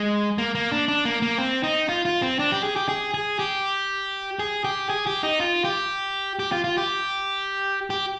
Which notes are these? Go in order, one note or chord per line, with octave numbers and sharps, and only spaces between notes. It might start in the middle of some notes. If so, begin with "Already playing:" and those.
Already playing: G#3
A#3
A#3
D4
D4
A#3
A#3
C4
D#4
F4
F4
C4
D4
G4
G#4
G4
G#4
G#4
G4
G#4
G4
G#4
G4
D#4
F4
G4
G4
F4
F4
G4
G4